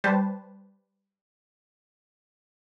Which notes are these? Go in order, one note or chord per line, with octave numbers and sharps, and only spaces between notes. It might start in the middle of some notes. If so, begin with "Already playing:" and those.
G3 G4 B4 C5 A5